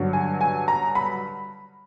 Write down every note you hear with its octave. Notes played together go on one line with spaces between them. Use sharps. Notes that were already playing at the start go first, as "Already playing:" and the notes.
Already playing: G2 D3 F#3
G#5
G#5
A#5
B5